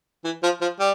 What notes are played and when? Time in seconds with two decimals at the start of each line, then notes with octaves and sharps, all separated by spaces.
0.25 E3
0.43 F3
0.61 F3
0.79 G3